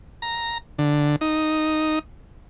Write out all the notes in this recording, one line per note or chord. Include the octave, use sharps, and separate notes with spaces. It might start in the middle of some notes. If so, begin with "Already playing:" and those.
A#5
D3
D#4